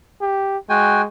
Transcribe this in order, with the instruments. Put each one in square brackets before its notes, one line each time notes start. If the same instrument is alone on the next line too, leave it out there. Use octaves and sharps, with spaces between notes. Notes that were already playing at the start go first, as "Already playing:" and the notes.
[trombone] G4
[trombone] G#3 [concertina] F#4 G5 G#5